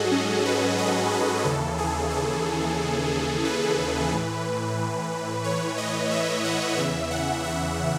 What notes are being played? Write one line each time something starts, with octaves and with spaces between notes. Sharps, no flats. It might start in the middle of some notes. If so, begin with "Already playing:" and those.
Already playing: G#2 F#3 F#4 G#4 A4 D#5
C#4
B4
D#5
B4
D#2 C#3 E3 A4
G#4
A4
B4
A2 E3
C#5
D#5
E5
F#5
E2 C#3 E3 E5
F#5
E5